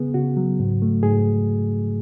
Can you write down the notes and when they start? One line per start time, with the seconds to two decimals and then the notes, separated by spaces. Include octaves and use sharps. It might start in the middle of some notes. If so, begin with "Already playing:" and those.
Already playing: C#3 B3 G#4
0.14 C#3 F#4
0.37 F#3
0.60 G#2
0.82 A3
1.03 G#2 G#4